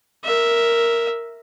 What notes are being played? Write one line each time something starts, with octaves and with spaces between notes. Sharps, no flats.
A#4 E5